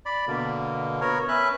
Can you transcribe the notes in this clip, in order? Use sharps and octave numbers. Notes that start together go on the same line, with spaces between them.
D5 B5
B2 D3 A#3
B3 F#4 A#4 C#5
C#4 B4 E5 F#6